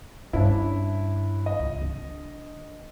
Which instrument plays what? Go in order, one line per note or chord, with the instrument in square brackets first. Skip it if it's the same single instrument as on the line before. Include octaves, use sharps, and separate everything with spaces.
[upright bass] G2 D3 [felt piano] C#4 D4 E4
[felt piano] D#5
[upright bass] C#2
D3